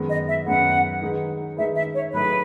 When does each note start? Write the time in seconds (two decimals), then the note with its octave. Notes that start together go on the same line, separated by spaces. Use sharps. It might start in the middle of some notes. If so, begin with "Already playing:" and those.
Already playing: F#2 D#3 G#3 B3
0.10 D#5
0.27 E5
0.46 F#2 D#3 G#3 B3 F#5
1.02 D#3 G#3 D#4 G#4 B4
1.57 D#3 G#3 D#4 G#4 B4 E5
1.75 E5
1.94 C#5
2.12 A2 F#3 A3 D#4 G#4 B4